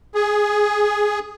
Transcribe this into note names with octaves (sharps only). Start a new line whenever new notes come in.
G#4